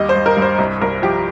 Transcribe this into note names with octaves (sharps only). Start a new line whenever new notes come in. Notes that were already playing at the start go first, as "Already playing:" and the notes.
Already playing: D#2 G3 D#5
C5
G2
A#4
G2
C5
C2
C2 A#4
F3 G4